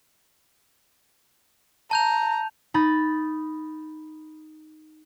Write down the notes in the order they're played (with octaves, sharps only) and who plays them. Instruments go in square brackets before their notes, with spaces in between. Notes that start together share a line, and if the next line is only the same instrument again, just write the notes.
[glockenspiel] A5 G6 F7 [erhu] A#5
[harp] D#4 B5 A6